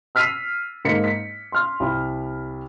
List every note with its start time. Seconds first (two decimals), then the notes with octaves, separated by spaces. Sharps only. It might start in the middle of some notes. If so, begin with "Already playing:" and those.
0.15 E6 F6 B6 C7 D#7 F7
0.85 G#2 A#3 D#4 A#5 B6 C#7
1.04 B6
1.52 C6 F6
1.80 C2 B5